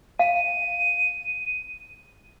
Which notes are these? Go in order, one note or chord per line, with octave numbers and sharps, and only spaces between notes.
F5 D#7